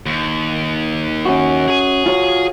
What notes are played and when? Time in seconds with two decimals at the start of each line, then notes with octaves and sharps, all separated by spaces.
0.06 D#2
1.26 C#4 F#4
1.68 G#4 G#5
2.06 F4 F#4 C#5